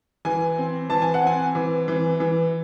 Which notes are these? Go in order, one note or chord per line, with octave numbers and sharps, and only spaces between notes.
E3 G#5
C4
E3 A5
G#5
F#5
C4 G#5
E3
E3
E3